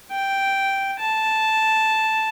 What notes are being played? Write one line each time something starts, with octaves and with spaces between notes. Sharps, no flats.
G5
A5